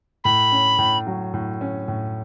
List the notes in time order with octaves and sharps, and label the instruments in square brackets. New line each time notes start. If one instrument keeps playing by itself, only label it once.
[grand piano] A2 [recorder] B5
[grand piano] C#4
A2
F#3
A2
C#4
A2